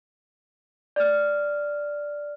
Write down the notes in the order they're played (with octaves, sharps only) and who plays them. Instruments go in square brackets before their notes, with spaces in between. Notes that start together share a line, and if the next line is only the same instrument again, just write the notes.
[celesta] D5 F6